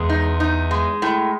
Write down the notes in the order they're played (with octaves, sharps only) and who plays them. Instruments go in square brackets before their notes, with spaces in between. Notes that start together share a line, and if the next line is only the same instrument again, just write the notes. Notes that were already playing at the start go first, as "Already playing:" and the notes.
Already playing: [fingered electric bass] E2 E3 [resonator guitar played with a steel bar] G#3
[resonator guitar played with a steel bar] D#4
D#4
G#3
A2